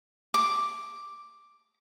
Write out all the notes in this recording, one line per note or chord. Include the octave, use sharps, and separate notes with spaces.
D6